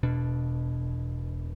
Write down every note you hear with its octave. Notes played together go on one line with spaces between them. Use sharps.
E1 B2 D4